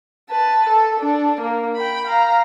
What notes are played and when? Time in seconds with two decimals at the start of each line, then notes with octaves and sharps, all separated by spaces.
0.30 B4 A5
0.69 A4
1.00 D4
1.41 A#3
1.75 G5 B5
2.07 F5 A#5